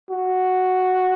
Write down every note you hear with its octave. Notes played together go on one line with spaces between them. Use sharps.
F#4